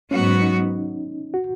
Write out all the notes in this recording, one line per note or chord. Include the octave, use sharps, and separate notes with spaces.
G#2 F#3 B3 C#4 F#4
D#4
F#4